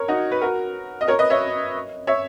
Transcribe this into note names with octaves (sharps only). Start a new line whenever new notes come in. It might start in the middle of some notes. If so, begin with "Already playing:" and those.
Already playing: A#4 C#5
D#4 F#4
B4
F#4 A#4
D#5
A#4 C#5
B4 D#5
C#5 E5
C#5 E5